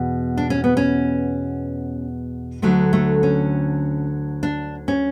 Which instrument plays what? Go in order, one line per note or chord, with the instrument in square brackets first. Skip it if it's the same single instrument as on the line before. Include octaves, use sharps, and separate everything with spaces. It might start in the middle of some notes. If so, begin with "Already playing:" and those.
Already playing: [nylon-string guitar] E2 B2
D4
C#4
B3
C#4
D2 D3 F#3 A3
A3
C#4
D4
C#4